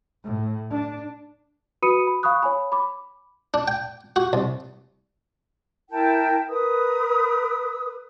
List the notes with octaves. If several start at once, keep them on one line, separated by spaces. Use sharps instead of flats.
A2
D4
F#4 B4 B5 D#6 C#7 D#7
B5
F5 B5 C#6 D#6 F#6
C#5 G#5 B5
B5 D6
D4
G5
F#4
C2
E4 A#4 G5 A5
A#4 B4 D#6